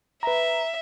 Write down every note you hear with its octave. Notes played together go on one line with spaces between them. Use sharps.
B4 E5 A#5